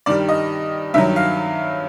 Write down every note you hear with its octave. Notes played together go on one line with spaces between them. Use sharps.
G2 D#3 G3 D5
D#5
G2 D#3 F#3 E5
F5